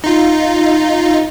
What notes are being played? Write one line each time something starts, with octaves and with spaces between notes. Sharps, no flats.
D#4 F4